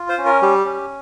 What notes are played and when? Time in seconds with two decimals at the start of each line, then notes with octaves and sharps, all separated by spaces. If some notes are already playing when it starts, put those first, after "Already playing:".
Already playing: F4
0.09 C5
0.18 C#4
0.26 A#4
0.42 G3 G4
0.65 C#4